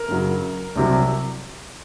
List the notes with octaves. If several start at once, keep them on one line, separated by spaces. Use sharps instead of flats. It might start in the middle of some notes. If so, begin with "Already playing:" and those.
Already playing: A#4
F#2 C#3 F#3
C2 C3 F#3